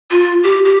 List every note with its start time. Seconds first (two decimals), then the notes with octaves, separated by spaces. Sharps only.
0.11 F4
0.44 G4
0.65 G4